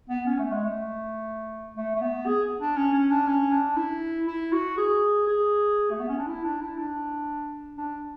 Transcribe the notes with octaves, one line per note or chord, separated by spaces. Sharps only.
B3
C#4
A3
G#3
A3
A3
A3
B3
G#4
D4
C#4
C#4
D4
C#4
D4
E4
E4
F#4
G#4
G#4
A3
B3
C#4
D4
E4
D4
E4
D4
D4